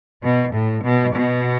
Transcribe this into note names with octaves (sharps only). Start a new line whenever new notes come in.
B2
A2
B2
B2